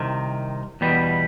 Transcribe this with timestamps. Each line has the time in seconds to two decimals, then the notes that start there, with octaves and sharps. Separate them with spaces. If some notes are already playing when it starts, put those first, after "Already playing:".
Already playing: C2 C3 D#3
0.81 E2 B2 G3 B3